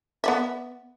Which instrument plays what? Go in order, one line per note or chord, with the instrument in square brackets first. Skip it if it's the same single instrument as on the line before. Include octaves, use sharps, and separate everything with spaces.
[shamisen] B3 D5 E5